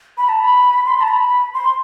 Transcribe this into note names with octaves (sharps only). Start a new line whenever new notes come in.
B5
A5
B5
C6
B5
A5
B5
C6